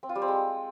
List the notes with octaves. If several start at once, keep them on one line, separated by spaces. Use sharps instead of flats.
C4
F4
G3
C4
G#3